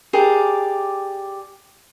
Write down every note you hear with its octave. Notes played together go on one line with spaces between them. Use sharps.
G4 G#4 A#4 D5